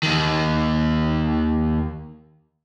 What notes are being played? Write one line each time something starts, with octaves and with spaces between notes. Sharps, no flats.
D#2 D#3